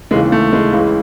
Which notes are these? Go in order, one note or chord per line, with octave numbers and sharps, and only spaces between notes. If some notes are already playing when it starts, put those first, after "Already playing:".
D#2 C#3 E3 G#3
A3
G#3
C#2 C#3 E3